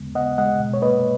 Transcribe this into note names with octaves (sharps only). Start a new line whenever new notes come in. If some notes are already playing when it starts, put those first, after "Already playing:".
Already playing: D#2 C#3 G#3 B3
B3 D#5 F#5
G#3 D#5 F#5
B2
C#5
A#3 B4 D#5